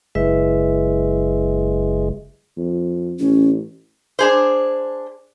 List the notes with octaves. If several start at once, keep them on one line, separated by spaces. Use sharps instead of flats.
F#1 G#3 E4 B4 E5
F2
A1 C#4
D4 G#4 C5